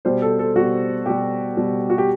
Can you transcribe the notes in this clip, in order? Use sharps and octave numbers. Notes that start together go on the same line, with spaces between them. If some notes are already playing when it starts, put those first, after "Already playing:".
B2 G3 C5
A4
A4
B2 G3 F#4
B2 G3 G4
B2 G3
F#4
G4